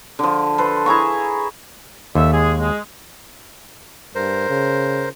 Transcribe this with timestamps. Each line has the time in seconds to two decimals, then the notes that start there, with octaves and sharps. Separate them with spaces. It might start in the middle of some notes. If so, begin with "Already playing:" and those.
0.19 D3 F3
0.58 A4 B4 C5
0.86 E4 G#4 A#5 C#6
2.15 D#2 A4 D5 E5
2.32 G#3 G#4
2.59 G#3
4.15 G2 A#4 C5
4.49 C#3